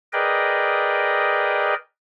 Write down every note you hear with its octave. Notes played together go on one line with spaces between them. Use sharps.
G#4 A#4 B4 D5 D#5 G5